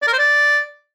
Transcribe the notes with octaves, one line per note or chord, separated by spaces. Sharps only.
D5
A#4
C5
D5